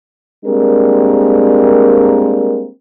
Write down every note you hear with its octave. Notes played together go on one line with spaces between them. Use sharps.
G3 G#3 A#3 C4 D4 A#4